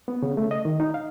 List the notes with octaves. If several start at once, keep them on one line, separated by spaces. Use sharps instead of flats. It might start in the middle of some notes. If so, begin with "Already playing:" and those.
B3
C#3
A3
D#5
D#3
D#4
F5